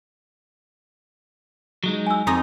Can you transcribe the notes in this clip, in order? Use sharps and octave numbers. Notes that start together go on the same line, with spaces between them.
F#3 G#3 D#4
G#5 E6
F2 D#4 D#5